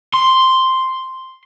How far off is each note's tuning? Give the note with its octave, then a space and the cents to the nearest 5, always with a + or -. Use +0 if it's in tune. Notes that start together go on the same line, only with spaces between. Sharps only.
C6 +0